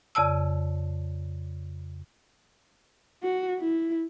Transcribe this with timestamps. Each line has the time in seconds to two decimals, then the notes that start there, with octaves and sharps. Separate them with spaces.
0.15 F2 C#3 D5 A5 E6
3.23 F#4
3.59 E4